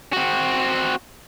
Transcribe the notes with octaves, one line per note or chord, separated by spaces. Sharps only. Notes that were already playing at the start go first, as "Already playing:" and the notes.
C4 F#4